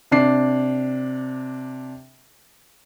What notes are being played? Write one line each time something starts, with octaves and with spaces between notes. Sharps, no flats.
C3 D4 C7